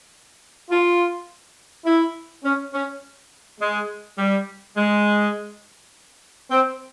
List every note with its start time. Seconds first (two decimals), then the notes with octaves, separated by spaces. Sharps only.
0.70 F4
1.85 E4
2.43 C#4
2.73 C#4
3.60 G#3
4.18 G3
4.76 G#3
6.50 C4